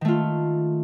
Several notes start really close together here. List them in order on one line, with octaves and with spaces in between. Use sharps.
D#3 A3 F4